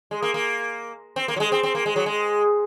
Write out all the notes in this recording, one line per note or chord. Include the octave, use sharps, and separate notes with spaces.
G#3
A#3
A#3
C4
A#3
F#3
G#3
C4
C4
A#3
G#3
F#3
G#3